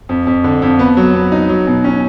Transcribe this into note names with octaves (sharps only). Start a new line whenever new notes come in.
F2
F2
D3
F2
B3
F#3
B3
D#4
F#3
B2
C#4